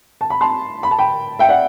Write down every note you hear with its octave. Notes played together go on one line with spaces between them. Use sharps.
A5
B5
A5 C6
B5
A5
G5 B5
E5 G5
D5 F#5